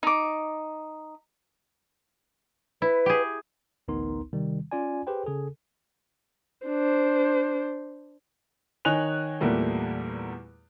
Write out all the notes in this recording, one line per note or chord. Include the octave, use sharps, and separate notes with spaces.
D#4 D6
E4 B4
G4 G#4
A1 D2 B3 D#4 A#4 C6
C3 D#3 G3
C#4 F4 D5 G#5
G4 G#4 B4 C5 G5
C#3 G#4 A4
D4 C5
D#3 D#4 C#5 G#5 F#6 F7
E2 A#2 G3 A3 A#3